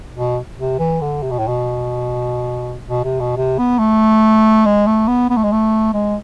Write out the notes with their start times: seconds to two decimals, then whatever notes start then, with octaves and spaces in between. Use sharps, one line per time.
0.15 B2
0.58 C3
0.79 E3
1.01 D3
1.22 C3
1.31 B2
1.39 A2
1.48 B2
2.88 B2
3.04 C3
3.20 B2
3.37 C3
3.58 B3
3.79 A3
4.65 G#3
4.86 A3
5.08 B3
5.30 B3
5.37 A3
5.43 G#3
5.52 A3
5.93 G#3